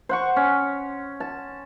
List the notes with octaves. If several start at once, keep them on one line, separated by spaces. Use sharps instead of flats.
C5 F#5 C#6
C#4
A5